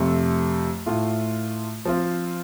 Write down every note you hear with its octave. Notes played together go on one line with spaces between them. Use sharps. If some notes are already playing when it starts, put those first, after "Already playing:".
Already playing: F2 C3 A3
A2 A3 F4
F3 C4 F4